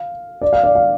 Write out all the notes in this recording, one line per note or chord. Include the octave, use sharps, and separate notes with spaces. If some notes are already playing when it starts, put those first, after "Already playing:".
Already playing: F5
D5
F5
D5
F5